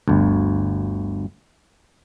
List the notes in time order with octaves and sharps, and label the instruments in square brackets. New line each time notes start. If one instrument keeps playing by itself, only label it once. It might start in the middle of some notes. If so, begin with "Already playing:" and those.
[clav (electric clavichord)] G1 D2